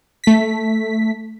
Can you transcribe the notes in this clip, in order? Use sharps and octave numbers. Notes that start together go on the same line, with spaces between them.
A3 B6